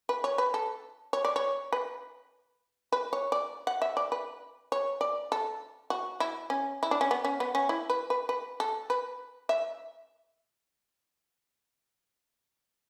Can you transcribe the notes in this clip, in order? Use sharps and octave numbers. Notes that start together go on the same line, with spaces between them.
B4
C#5
B4
A4
C#5
D5
C#5
B4
B4
C#5
D5
F#5
E5
D5
B4
C#5
D5
A4
F#4
E4
C#4
E4
D4
C#4
B3
C#4
B3
C#4
E4
B4
B4
B4
A4
B4
E5